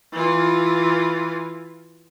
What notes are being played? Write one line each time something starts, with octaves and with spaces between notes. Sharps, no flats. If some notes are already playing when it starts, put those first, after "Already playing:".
E3 F4